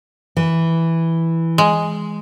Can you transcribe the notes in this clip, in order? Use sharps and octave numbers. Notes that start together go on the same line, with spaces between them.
E3
G#3